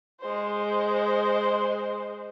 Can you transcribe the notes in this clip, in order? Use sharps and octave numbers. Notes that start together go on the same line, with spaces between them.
G#3 C5